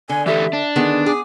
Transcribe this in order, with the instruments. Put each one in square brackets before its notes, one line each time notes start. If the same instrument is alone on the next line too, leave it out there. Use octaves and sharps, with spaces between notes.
[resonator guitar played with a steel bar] D3 [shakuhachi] G#5
[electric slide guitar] E3 G4 A4 [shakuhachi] E5
[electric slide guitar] D4
[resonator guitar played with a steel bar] D3 D#3 B3 [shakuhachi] G#4
[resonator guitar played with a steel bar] G#4 [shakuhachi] D6